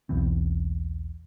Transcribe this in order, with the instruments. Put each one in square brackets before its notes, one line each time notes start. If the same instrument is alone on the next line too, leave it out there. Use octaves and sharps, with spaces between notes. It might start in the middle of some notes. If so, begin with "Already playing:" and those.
[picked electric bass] B1 E2 E3 C4